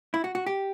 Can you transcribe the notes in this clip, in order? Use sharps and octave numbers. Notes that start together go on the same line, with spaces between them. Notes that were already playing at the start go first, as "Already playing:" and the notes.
E4
F#4
F#4
G4